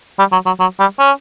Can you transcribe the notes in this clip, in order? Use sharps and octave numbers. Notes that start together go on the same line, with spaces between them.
G3
F#3
F#3
F#3
G3
C#4